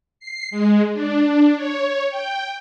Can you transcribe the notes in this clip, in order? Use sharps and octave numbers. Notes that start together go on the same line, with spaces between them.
C7
G#3
D4
C#5
G5